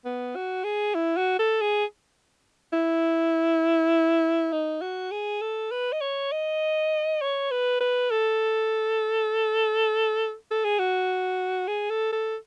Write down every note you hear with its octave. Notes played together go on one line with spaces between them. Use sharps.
B3
F#4
G#4
E4
F#4
A4
G#4
E4
D#4
F#4
G#4
A4
B4
D#5
C#5
D#5
C#5
B4
B4
A4
A4
G#4
F#4
G#4
A4
A4